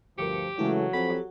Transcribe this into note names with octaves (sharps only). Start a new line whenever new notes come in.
D2 G2 F3 G4 A#4 D6 C#7
C#3 E3 F#3 G#3 A3 E4
F2 C4 G4 A4 F#5 B5